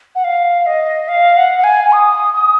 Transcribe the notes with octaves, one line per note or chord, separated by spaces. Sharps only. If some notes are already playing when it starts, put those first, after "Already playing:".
F#5
F5
D#5
F5
F#5
F#5
G#5
D#6
D#6